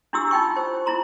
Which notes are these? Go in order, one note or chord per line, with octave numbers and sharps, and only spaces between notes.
D4 E4 F#4 G4 E6
D#4 F4 G5 C#6
C5
E4 F4 A#5 C6